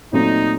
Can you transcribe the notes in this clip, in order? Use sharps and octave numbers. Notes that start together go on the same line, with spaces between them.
A#2 F#3 A3 C4 D#4 F4